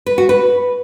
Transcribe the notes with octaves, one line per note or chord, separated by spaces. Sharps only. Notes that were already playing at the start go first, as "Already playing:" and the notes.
B4
F#4
B4